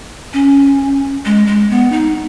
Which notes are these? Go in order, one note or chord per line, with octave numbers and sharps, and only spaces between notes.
C#4
G#3
G#3
B3
D#4